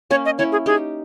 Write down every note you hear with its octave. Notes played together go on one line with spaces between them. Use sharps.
A#3 C#4 C#5
D#5
C#4 E4 C#5
G#4
D#4 G4 G#4